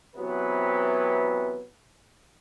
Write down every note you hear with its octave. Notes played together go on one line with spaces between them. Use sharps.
C3 E3 F#3 B3 C4 B4